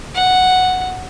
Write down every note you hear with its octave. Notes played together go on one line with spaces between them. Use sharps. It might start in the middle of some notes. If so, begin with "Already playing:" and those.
F#5